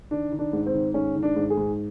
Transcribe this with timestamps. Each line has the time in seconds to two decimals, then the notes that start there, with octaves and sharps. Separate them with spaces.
0.11 D#3 D4
0.32 D#3
0.39 D4
0.53 G#2
0.67 C4
0.74 D#3
0.94 G#2 C#4
1.16 D#3
1.23 D4
1.36 G#2
1.50 G#4
1.57 G#2